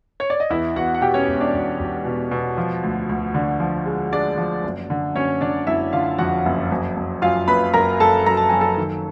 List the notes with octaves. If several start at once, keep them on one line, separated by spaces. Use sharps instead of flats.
C#5
D5
D#5
E2 E4 E5
E2 F#4 F#5
F#5
B2 G4 G5
C#4 C#5
E1
D4 D5
E1
E1
B2
B2
F3
D2
D2
D3
F3
G#3
G#3 D4 D5
F3
F#1
D3
F#1 C#4 C#5
D3 D4 D5
F#1 E4 E5
D3 F4 F5
F2 F#4 F#5
F#1
F#1
F#1
F#2 F4 F5
F#1 B4 B5
F#1 A#4 A#5
F#2 A4 A5
F#2 A#5
A5
F#2 G#5
A4 A5
D#3